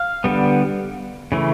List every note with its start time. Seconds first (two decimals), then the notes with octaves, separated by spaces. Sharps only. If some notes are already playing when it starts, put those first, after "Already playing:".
Already playing: F5
0.24 D3 G3 B3
1.32 C#3 E3 A3